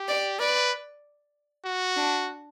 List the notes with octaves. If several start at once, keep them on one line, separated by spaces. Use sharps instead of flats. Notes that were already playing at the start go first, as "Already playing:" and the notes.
Already playing: G4
D5
B4 D5
F#4
D4